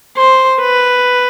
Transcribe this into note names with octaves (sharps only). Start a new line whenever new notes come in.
C5
B4